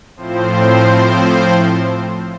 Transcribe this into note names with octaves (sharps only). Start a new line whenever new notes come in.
A2 F3 C4 C5